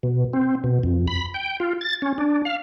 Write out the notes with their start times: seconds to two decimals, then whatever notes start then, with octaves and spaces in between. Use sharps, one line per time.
0.03 B2
0.33 C4
0.64 B2
0.83 F2
1.07 B5
1.34 G5
1.60 F4
1.81 A6
2.02 C#4
2.18 D4
2.45 F5